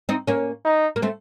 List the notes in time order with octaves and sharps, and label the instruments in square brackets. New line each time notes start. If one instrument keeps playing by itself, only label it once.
[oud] C4 D#4
A#3 C#4
[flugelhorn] D#4
[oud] A#3
A3 C4